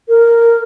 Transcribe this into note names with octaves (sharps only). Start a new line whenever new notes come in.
A#4